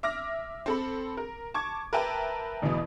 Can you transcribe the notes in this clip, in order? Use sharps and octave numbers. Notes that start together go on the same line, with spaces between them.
E5 D6 F6 A#6
C4 A4 B5
A#4
A5 C#6 D6 G#6
A#4 B4 E5 G5 A5
A1 E2 B2 E3